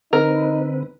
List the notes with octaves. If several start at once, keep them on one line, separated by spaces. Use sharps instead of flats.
D3 C4 D#4 A#4 B4